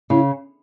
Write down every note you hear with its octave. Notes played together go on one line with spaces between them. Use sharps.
C#3 E4